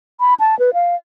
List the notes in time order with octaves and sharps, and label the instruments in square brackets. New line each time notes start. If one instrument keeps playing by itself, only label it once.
[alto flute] B5
A5
B4
F5